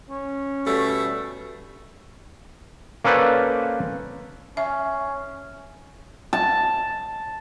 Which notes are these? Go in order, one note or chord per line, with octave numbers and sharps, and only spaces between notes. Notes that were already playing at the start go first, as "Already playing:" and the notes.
C#4
B2 G3 A3
A#3 C#4 A4 B4 C5 D5
C#4 E5
A5